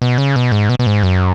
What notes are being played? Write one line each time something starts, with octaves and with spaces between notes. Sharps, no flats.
B2
C#3
B2
G#2
B2
B2
G#2
F#2